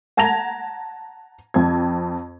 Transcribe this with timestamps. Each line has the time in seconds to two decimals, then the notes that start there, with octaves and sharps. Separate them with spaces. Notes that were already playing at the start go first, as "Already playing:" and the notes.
0.17 F#5 A5 A#5 G#6 A#6 F7
1.54 F2 C4 G#6